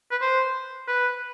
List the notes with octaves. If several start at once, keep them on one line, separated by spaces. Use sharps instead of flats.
B4
C5
B4